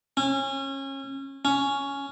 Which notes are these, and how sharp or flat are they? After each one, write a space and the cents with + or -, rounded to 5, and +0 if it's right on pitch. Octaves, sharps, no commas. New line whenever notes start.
C#4 -25
C#4 +10